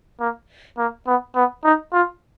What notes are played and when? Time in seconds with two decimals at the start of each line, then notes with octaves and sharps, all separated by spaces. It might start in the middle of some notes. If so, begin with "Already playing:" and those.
0.20 A#3
0.78 A#3
1.07 B3
1.35 B3
1.64 D#4
1.93 F4